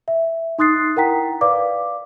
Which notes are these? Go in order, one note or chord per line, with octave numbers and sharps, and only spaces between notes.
E5
D#4 C6 D#6 F#6 A6 C7
E4 A#4 F#5 G5 A#5 B6
B4 D5 F5 D6